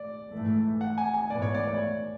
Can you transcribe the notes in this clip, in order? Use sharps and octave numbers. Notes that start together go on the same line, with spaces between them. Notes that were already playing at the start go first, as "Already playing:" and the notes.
Already playing: D5
G#2 E3 A3
F#5
G#5
G#5
G#2 E3 B3 D5
C#5
D5
C#5
D5
C#5